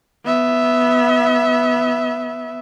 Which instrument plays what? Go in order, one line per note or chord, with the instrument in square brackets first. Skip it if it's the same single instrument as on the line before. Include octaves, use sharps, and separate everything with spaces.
[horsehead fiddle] B3 E5